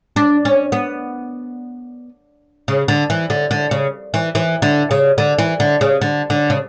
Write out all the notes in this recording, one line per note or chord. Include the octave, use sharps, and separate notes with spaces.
D4
C#4
B3
C#3
D3
E3
D3
D3
C#3
E3
E3
D3
C#3
D3
E3
D3
C#3
D3
D3
C#3